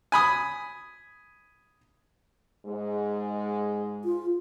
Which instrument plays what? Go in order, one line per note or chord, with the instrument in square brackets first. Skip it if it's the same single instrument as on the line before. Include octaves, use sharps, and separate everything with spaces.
[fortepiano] G#5 B5 D#6
[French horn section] G#2 G#3
[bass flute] F4